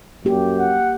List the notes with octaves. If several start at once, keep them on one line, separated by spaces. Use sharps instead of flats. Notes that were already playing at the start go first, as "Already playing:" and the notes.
F#2 A#3 G4
F#5